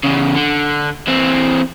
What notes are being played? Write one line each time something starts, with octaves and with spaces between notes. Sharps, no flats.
E2 C#3
D3
E3 C4